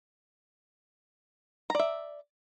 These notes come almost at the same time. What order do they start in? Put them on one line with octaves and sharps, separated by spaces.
A#5 D5 E5